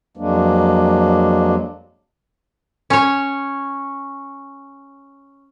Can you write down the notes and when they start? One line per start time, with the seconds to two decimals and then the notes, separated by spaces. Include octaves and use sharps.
0.17 F2 F#3 G#3 A#3 D4
2.90 C#4 C#5